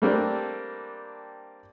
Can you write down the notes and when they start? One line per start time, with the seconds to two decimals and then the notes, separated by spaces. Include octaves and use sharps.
0.02 G3 A3 A#3 C4 D4